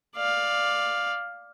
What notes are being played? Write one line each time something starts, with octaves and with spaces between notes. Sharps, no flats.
D5 F5